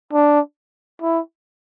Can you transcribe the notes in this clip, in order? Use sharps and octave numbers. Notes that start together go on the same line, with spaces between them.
D4
E4